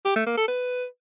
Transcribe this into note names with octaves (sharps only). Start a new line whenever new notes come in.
G4
A3
A#3
A4
B4